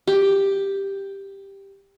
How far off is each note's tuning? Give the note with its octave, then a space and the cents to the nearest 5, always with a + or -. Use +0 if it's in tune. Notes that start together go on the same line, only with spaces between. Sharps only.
G4 +5